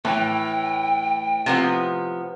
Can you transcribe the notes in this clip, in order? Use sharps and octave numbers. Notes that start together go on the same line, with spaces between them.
A2 E3 G5
C3 F3 B3